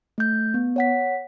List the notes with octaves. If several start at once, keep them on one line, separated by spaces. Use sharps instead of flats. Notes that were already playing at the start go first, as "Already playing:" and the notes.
A3 G6
B3
C#5 F#5 B6